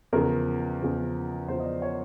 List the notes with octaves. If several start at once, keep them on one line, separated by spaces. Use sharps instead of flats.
E2 C#3 F3 A#4
E2 C#3 F3
E2 C#3 F3 C5
D#5
D5
C#5